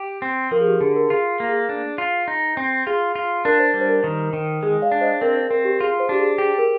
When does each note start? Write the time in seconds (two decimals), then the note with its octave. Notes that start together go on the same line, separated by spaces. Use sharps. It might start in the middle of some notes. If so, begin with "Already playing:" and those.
Already playing: G4
0.22 C4
0.51 F3 A#4
0.61 G#4
0.67 G4
0.81 D3 G#4
0.96 A#4
1.10 F4 G#4
1.40 A#3
1.49 G#4
1.69 D4
1.98 F4
2.28 D#4
2.57 C4
2.87 F4 G#4
3.16 F4
3.45 D4 A#4
3.59 C5
3.74 G3
3.81 C5
3.89 A#4
4.04 D#3
4.33 D#3
4.63 G#3 G#4
4.82 D5 F5
4.92 D4
5.01 C5 D#5
5.21 C4 A#4 D5
5.36 C5
5.50 C4 A#4
5.65 G4
5.80 F4 G#4
6.00 C5
6.09 D4 G4
6.19 G#4
6.38 G4 G#4
6.58 A#4